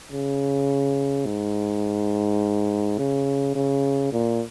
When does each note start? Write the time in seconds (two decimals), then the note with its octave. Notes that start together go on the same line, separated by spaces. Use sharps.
0.12 C#3
1.26 G#2
2.98 C#3
3.55 C#3
4.13 A#2